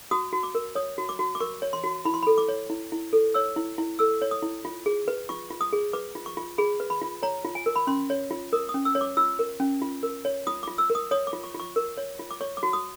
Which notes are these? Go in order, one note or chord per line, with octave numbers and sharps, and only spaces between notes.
F#4 D#6
F#4
D6
A#4
C#5 D#6
F#4
D6
F#4
D6
A#4 C#6
C#5
C6
F#4
E4 B5
C6
A4 B5
D6
C#5
E4
E4
A4
C#5 E6
E4
E4
A4 E6
C#5
D#6
E4
F4
G#4
B4
F4 C#6
F4
D#6
G#4
B4 D6
F4
C#6
F4
G#4 B5
B4
B5
F4
C#5 A#5
F4
G#5
A#4
B5
C#4 C6
C#5
F4
A#4 D#6
D#6
C#4
E6
C#5
D6
F4 E6
A#4
C#4
F4
A#4
C#5
F4 D#6
F4 D6
E6
A#4
D#6
C#5 D#6
D6
F4
C#6
F4
C#6
A#4
C#5
F4
D6
C#5 C#6
D6
F#4
D#6